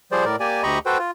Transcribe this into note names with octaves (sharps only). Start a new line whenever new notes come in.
F3 G3 G#4 C5 D5
A2 A#4 D5
A#3 G4 D5 G#5
D2 G4 D#5 A#5 B5 C#6
F#4 A4 B4 C5 G5
F4